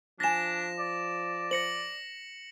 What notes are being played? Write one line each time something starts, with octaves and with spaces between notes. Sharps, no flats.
F3 D4 G#5 A6 A#6 E7
D5
C5 A#6 C#7 F#7